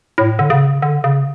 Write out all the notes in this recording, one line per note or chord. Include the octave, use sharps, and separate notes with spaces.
A2
D3
C#3
D3
C#3